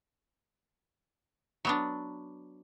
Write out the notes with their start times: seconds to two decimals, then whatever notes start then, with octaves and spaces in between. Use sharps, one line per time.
1.65 F#3 B3 D4